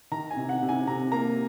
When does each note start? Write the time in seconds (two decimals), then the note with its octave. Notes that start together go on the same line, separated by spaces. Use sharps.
0.11 D#3 A#5
0.31 G#5
0.37 C3
0.49 F#5
0.62 C3
0.69 G#5
0.87 C3 A#5
1.12 A#3 A#5